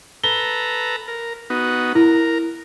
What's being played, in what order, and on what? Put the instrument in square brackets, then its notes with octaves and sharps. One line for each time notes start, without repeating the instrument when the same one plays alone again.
[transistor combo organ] A4 B4 A#5 [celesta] G7
[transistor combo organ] A#4
B3 D#4 F#4
[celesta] E4 [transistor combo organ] A#4